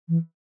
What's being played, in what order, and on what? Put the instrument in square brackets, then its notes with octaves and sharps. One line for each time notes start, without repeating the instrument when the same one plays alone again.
[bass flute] E3